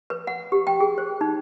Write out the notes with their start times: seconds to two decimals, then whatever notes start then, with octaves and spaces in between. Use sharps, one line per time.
0.10 B4
0.27 F#5
0.52 G4
0.67 G5
0.80 G#4
0.98 C5
1.21 D#4